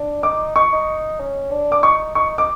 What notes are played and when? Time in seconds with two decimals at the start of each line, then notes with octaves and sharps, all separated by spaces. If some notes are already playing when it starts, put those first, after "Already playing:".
Already playing: D4
0.23 D#4 D6
0.55 D#4 C#6
0.73 D#4
1.19 C#4
1.51 D4
1.72 D6
1.83 D#4 C#6
2.15 D#4 C#6
2.38 D#4 D6